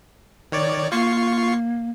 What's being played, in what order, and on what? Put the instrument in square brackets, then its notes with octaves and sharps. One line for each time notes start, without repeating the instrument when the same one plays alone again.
[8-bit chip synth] D#3 C#5 D5
[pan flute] A#3 [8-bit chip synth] F4 C#6 C7